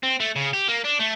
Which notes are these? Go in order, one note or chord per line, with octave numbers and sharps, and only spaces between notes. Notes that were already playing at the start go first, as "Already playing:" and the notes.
C4
A3
C#3
G4
A#3
D4
A3